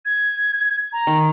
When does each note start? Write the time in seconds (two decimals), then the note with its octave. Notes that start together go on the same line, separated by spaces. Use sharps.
0.06 G#6
0.93 A#5
1.07 D#3